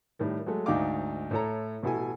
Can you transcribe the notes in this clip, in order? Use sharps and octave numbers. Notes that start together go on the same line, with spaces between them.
A2 D#3 G3
F#3 G#3 A3
D2 G#2 D#4 D5 F5 D6
A2 E4 A4 C#5 A#5
A1 B2 E4 A4 G#5